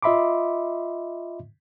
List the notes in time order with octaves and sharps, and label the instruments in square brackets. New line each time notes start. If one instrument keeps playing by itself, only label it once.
[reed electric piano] F4 D#5 E5 B5 C6 D6